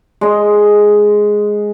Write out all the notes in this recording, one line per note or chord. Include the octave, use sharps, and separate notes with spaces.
G#3 D#5